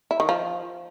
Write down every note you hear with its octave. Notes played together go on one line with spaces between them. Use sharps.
E4
D#3
F3